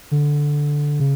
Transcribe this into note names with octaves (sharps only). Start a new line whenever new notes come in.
D3
C#3